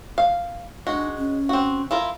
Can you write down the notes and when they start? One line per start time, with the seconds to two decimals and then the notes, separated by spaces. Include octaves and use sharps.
0.18 F5
0.87 G#3 D4 F#4
1.17 C#4
1.49 C4 F#4
1.91 E4 F4 A#4